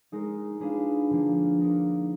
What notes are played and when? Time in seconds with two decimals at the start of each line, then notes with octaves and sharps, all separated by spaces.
0.12 G#3 D#4 A#4
0.60 G#3 D4 F4 G#4 B4
1.10 D3 F3 A#3
1.59 A#3 D#4 A#4